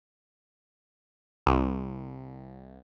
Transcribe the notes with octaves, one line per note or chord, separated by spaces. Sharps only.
C2